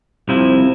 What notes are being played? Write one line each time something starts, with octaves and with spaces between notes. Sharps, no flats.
C2 C3 F3 E4